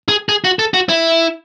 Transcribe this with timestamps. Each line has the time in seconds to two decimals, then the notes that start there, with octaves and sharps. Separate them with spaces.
0.09 G#4
0.29 G#4
0.44 F#4
0.59 A4
0.74 F#4
0.89 E4